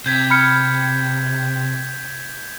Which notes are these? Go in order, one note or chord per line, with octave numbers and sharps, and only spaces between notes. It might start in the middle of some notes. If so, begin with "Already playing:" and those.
C3 G6 G#6 B6
B5 F6 C#7